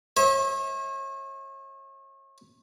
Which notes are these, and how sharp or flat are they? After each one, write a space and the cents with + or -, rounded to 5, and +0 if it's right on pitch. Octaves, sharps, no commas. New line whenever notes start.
C#5 -40 E5 -40